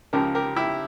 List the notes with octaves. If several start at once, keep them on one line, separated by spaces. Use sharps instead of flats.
C#2 C#3 F3 G4 A#4
G4 A#4
E4 G4